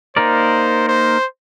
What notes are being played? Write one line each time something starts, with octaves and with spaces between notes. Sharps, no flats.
A#3 D#4 A#4 C5 D5
C5